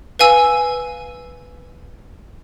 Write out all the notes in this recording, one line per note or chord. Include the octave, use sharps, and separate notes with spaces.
B4 F5 G#5 E6